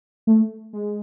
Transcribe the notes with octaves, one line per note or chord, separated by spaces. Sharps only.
A3
G#3